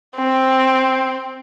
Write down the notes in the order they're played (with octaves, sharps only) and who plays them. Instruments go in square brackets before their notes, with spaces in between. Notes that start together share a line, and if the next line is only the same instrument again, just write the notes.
[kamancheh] C4